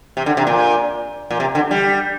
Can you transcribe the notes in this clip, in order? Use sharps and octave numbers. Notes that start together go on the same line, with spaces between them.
C3
D3
C3
A#2
A#2
C3
D3
G3